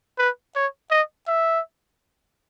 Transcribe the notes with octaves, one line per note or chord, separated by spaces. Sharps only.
B4
C#5
D#5
E5